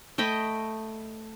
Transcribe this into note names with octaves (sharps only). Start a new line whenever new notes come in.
A3 D#5 G5 B5